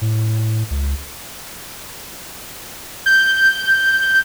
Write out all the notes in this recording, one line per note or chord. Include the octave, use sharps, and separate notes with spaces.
A2
C#2
G6